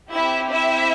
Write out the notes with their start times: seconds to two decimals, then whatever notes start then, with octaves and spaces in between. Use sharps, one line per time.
0.12 C4 E4 G4 E5
0.51 E4 E5